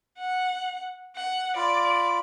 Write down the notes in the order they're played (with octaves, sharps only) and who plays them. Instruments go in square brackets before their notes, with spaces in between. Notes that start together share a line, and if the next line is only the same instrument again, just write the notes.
[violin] F#5
F#5
[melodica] F4 B5 [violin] D5